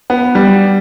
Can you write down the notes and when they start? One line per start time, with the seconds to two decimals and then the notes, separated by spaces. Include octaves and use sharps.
0.10 B3
0.35 G3